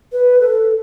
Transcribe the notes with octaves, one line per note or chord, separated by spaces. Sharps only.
B4
A4